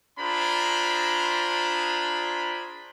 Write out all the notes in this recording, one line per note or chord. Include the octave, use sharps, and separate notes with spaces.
D4 F4 G#4 C5 A#5 B5